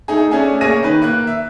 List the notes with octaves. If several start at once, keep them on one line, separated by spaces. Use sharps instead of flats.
A3 D#4 G#4
A3 C#4 D4 G#4
A#3 G#4 C#5 A#6 D#7
D#3 B4
A#3 F#6
E5